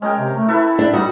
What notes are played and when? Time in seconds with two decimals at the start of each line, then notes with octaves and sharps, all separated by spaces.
0.02 G#3 C#4 A#4 G5
0.18 C3
0.35 A3
0.48 E4 A4 B4 E5
0.79 D4
0.94 G3 D#4 F#4